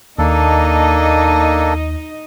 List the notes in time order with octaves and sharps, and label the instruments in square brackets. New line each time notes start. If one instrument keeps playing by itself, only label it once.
[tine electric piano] D#2 [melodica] A#3 D4 A4 [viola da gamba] D#4 D#5